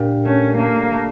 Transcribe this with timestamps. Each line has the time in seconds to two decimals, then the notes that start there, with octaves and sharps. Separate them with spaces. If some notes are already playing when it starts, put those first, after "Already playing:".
Already playing: A#2 D4 G4
0.25 A3 C#4
0.58 A3 A#3
0.92 A3